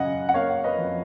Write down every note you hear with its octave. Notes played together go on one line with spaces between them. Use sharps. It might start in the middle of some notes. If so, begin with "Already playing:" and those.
Already playing: F#2 C#3 D#5 F#5 G#5
F#5
A#3 C#5 F5
B4 D#5
F2